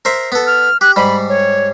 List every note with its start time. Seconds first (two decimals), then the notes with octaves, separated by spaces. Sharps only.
0.05 A#4 C5 E5
0.32 B3 A4
0.47 F6
0.81 G4 F#6
0.96 G#2 G3 B5
1.29 C#5